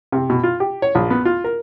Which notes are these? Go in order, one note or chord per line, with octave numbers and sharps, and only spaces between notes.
C3
B2
F4
G4
C#5
A#1
B3
F4
A#4